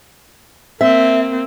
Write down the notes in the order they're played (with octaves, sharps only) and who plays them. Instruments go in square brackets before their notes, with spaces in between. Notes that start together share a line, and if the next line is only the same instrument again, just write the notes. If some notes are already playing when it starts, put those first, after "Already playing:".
[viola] A#3 C4 [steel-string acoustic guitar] E5